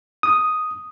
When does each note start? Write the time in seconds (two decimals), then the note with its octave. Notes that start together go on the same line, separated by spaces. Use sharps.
0.23 D#6